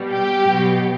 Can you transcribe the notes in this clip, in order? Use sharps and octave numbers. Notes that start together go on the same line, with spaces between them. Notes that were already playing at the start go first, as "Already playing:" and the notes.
Already playing: B2 G3
G4
B2 F#3